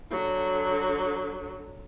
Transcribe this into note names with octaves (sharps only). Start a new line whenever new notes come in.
D3 F#3